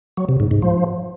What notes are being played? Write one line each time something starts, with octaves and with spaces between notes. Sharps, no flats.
F#3
C3
G#2
G#2
F3